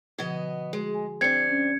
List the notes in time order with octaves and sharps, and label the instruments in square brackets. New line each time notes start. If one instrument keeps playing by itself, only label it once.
[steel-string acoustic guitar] B2 B3 D#5 [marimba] D3 F3 G#6
[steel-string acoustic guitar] G#3 [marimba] F#4 G#4
[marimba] G#5
[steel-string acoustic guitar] C4 D4 [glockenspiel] G#6 C#7
[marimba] C#4